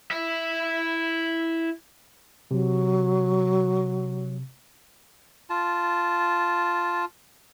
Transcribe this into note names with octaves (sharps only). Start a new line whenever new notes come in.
E4 E5
C3 F#3
F4 A5